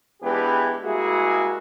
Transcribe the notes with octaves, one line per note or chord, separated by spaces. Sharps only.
E3 G#3 B3 D4 G4 B4
G3 G#3 A#3 E4 F#4 G#4